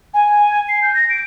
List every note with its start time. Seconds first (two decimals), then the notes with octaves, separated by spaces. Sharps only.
0.14 G#5
0.69 C7
0.82 G6
0.95 A#6
1.10 D7